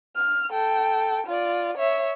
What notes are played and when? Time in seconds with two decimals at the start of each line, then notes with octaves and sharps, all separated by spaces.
0.16 F6
0.51 A4 G5
1.27 F4 D5
1.77 C#5 E5